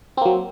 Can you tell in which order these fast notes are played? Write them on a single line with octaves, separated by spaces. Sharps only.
C4 A#3 F#3